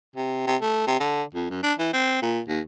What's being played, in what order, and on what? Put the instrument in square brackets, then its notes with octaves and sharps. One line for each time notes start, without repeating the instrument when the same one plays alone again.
[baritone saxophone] C3
C3
A3
C3
D3
F2
F#2
D4
E3
C4
A#2
D#2